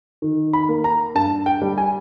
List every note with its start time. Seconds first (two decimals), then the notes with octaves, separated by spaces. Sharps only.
0.22 D#3
0.53 B5
0.69 A#3
0.84 A#5
1.15 G2 A5
1.46 G5
1.62 G3
1.78 G#5